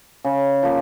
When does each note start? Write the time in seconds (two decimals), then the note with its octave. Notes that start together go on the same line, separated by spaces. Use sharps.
0.24 C#3
0.63 F3 A#3